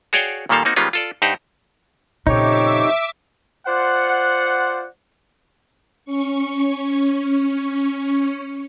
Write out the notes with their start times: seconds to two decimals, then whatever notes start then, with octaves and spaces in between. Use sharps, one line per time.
0.13 F#4 G#4 C#5 D5 F5 G5
0.49 A#2 D#3 G3 A#3 A4 F5
0.65 A#3 C4 D#4 F#4
0.76 D#3 G3 G#3 B3 C#4 F4
0.93 F4 A4 D5
1.22 G2 D#4 G4 C5 F#5
2.27 F2 A#2 C#3 D#4 G4 C#5 E5 D6
3.67 F4 C5 D5 F#5
6.05 C#4 C#6